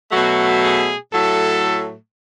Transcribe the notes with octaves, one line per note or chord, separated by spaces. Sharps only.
B2 F#3 A3 F#4
G#4
A2 F#3 A3 A4